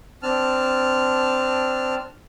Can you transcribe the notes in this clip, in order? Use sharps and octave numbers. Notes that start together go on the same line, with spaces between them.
C4 D4 A5 F6